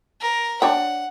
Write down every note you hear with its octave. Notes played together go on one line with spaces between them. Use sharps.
A#4
D4 C#5 F#5 G5